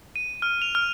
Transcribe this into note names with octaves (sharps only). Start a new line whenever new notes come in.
D#7
F6
F7
F6